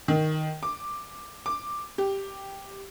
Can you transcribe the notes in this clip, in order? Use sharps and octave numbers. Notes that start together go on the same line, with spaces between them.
D#3
D6
D6
G4